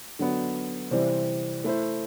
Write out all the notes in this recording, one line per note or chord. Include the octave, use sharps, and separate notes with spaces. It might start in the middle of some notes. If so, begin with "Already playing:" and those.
D3 F#3 B3
C3 E3 G3 C4
A3 E4 A4 C5